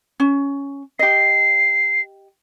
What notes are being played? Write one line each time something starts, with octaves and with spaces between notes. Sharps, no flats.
C#4
G4 D#5 C7